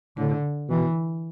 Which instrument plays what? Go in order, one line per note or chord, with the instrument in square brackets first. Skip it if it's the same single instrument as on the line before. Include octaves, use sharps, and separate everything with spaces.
[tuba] A2 [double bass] D3
[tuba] B2 [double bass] E3